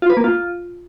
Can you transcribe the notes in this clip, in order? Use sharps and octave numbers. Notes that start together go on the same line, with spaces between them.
F4
B4
A#3
F4